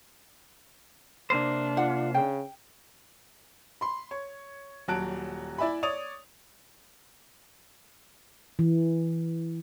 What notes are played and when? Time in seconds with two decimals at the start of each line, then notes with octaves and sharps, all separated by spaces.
1.30 C3 A#3 D4 C5
1.77 F4 F#5
2.14 C#3 G5
3.81 B5 C6
4.11 C#5
4.88 D#1 F#3 A5 F#6 D7
5.58 E4 D5 E5 G#5 B5
5.83 C#5 D5 D#6 F7
8.59 E3